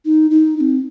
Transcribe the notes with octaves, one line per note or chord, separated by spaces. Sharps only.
D#4
D#4
D#4
C4